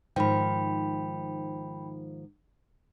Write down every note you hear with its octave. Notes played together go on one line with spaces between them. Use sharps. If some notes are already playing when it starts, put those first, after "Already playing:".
G#2 D#3 F3 G5 B5